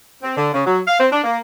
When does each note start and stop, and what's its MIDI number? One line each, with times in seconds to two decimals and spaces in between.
0.23 0.36 60
0.37 0.51 50
0.54 0.64 49
0.67 0.80 54
0.88 1.00 77
1.00 1.07 60
1.12 1.23 62
1.24 1.40 58